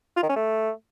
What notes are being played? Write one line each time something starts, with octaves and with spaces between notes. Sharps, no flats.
F4
D#3
C#4
A3